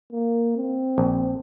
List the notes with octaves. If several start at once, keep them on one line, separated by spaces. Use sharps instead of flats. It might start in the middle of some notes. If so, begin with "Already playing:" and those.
A#3
C4
A#1